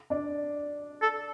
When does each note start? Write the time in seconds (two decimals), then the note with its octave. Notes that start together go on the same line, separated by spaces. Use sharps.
0.10 D4 D5
1.02 A4